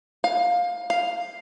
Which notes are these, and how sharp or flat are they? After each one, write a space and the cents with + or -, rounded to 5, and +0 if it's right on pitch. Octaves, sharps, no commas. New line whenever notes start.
F5 +20
F5 +5